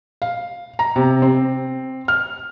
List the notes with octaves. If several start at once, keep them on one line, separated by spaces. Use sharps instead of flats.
F5
A#5
C3
C4
F6